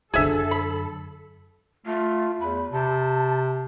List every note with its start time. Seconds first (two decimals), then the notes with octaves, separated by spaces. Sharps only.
0.14 F#2 D3 G#4 A4 E5
0.51 B5
1.87 A3 F4
2.41 E2 B5
2.72 C3 A5